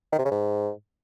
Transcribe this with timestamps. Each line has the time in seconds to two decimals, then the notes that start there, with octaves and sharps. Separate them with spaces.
0.12 D#3
0.19 C3
0.25 C#3
0.31 G#2